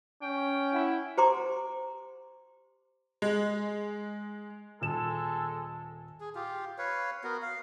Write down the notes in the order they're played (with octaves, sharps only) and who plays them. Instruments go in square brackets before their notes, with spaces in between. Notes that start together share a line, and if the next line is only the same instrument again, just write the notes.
[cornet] C#4 [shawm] G5
[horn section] E4 [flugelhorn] F#5
[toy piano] G4 C5 A#5 C6 D6
[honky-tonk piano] G#3
[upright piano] D#1 E7 [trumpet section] G#3 A4
[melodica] G#4
F4 G4
B4 C#5 F5
B3 F#4 A#4
F5